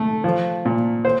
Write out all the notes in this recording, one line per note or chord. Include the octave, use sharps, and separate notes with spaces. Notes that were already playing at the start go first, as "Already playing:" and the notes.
Already playing: A3
F3
A#2
C5